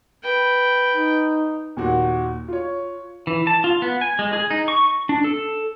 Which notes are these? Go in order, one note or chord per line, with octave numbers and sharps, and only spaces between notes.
B4 G5
D#4
D#2 A#2 F#4
F4 C#5
E3
A5
F4
B3
G#5
G#3
G#4
D#4
C#6
D4
A4